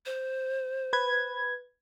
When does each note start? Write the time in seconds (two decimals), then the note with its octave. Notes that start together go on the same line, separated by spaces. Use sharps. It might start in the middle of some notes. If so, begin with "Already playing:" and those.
0.06 C5
0.93 B4 G#6